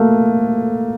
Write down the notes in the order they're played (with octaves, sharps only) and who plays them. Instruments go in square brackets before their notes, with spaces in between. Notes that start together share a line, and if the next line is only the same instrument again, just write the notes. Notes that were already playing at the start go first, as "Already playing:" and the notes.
Already playing: [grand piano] A3 A#3